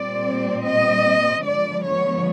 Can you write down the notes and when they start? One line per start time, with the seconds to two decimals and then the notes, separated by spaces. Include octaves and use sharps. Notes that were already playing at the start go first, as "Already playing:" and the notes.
Already playing: A#2 G3 C4 D5
0.63 D#5
1.43 D3 F3 G#3 B3 D5
1.84 C#5